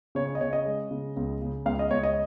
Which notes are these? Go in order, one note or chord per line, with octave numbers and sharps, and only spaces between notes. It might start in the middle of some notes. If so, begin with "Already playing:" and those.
C#3 C#5
C#5
D#5
C#3 C#5
D#5
G#3
C#3
C#2
C#3
C#2 F5
D#5
C#2 C#5
D#5